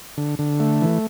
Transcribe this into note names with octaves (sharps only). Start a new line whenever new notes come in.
D3
D3
A3
E3